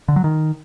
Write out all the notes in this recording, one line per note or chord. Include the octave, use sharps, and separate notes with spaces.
D3
F#3
D#3